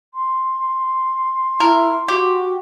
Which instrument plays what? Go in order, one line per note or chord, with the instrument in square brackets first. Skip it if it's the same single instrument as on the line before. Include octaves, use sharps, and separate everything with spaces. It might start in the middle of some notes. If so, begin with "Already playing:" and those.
[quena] C6
[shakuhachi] E4 [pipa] A#4
[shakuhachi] F#4 [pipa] G4